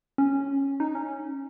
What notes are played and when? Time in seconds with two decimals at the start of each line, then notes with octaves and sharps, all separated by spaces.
0.18 C#4
0.80 D#4
0.95 C#4